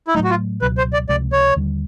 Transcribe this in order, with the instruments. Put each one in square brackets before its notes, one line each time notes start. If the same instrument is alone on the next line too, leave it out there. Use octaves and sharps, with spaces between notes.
[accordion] E4
[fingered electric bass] A2 F#3 A3 [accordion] D#4
[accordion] F#4
F4
[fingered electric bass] C#2 B2 F#3 [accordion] B4
[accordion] C5
D5
[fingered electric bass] C#2 C3 F3 G#3 [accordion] D5
[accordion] C#5
[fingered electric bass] D#2 D3 G3